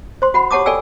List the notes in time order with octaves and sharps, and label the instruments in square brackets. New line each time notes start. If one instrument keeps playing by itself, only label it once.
[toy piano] C5 C6
F#4 F#5 B5
G4 C#5 F#5 A5 D6 D#6
A4 D5 G5 G#5 E6